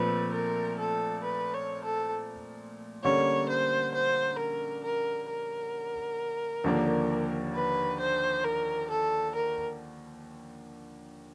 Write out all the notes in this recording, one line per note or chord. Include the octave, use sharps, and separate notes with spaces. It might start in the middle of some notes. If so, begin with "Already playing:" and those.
Already playing: A#2 F3 A3 C4 B4
A#4
A4
B4
C#5
A4
D3 G3 A#3 C#4 C#5
C5
C5
A#4
A#4
A#4
D#2 D3 F3 A#3 D4
B4
C5
A#4
A4
A#4